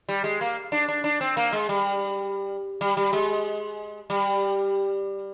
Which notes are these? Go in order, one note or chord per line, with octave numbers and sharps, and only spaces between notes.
G3
G#3
A#3
D4
D4
D4
C4
A#3
G#3
G3
G3
G3
G#3
G3